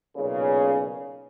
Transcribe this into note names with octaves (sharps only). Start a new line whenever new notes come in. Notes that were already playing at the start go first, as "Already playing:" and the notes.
B1 A#2 C#3